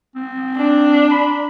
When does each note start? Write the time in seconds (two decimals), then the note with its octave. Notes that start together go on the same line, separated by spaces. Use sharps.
0.16 C4
0.56 D4
1.11 B5